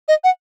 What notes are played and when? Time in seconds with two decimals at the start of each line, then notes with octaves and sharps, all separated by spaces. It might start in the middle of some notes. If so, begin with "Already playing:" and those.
0.09 D#5
0.24 F#5